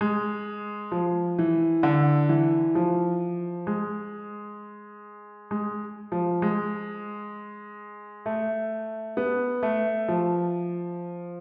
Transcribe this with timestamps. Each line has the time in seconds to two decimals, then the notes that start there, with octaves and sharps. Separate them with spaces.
0.01 G#3
0.92 F3
1.39 E3
1.83 D3
2.29 E3
2.75 F3
3.67 G#3
5.51 G#3
6.12 F3
6.42 G#3
8.26 A3
9.17 B3
9.63 A3
10.08 F3